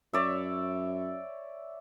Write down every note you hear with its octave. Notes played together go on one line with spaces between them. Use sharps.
F#2 C#5 D5 E5